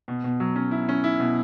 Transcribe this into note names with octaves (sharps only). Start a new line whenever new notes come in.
B2
B2
F#3
C#4
E4
C#4
E4
B2